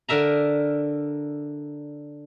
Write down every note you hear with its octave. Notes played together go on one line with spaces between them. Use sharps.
D3 A#4 E5 A#5